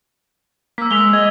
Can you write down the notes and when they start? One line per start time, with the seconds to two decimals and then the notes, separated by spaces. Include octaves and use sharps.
0.78 A#3 E6 B6
0.91 G#3 B6 F7 G7
1.13 D#5 G#6